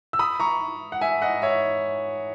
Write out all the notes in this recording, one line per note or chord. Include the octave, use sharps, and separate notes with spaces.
E6
B5 D#6
A#5 C#6
F#5
E5 G#5
D#5 F#5
C#5 E5